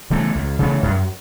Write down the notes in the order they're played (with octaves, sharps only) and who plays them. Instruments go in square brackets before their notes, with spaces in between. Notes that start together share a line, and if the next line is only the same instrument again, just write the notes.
[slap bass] C#3 E3 A3
C#2
C#3 E3 A3
F#2